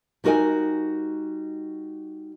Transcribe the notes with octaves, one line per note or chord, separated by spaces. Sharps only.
G3 D#4 F#4 A#4 D#5 G#5